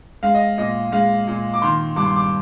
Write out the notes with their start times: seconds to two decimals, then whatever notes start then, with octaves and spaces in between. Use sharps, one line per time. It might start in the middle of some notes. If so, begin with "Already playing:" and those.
0.23 G#3 F5
0.35 D#5
0.58 A#2 D#5
0.92 G#3 F5
1.27 A#2
1.54 D6
1.62 D#3 C6
1.96 G2 D6
2.06 C6
2.16 D6